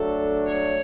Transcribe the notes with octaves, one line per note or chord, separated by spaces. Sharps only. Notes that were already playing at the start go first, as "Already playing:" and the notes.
Already playing: F#3 A3 D4 A4
C#5